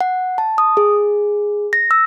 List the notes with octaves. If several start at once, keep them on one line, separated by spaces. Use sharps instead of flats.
F#5
A5
D#6
G#4
A#6
E6